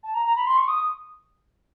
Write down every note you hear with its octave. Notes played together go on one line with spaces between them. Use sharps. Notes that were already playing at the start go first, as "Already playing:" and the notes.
A5
A#5
A#5
B5
C6
C#6
D#6